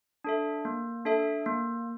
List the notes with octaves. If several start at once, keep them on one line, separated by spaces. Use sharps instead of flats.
D4 A4 E5
A#3
D4 A4 E5
A#3